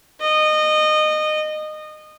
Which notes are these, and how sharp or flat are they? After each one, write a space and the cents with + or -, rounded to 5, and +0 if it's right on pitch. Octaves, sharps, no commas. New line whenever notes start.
D#5 -20